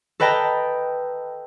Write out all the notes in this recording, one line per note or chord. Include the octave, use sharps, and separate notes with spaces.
A4 B4 D#5 G5 A5 A#5